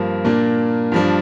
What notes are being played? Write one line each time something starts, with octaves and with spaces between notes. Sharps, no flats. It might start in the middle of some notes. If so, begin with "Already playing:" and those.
Already playing: G2 F3 A#3 F4
A#2 A#3 D4
G2 F3 D4